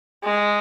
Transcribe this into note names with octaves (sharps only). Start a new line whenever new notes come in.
G#3